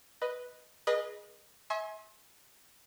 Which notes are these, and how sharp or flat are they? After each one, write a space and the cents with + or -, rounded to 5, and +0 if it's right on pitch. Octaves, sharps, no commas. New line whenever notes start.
B4 +0 D#5 +0
G#4 +0 B4 -35 D#5 -20
E5 -35 G#5 +15 C6 +35